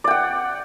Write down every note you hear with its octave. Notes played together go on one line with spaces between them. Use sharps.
D5 F#5 G5